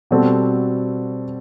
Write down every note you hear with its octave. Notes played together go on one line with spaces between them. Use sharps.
B2 G3 C4 F#4 A4